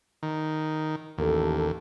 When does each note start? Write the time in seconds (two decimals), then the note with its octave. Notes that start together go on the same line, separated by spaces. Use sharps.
0.23 D#3
1.18 A1 D#2 A4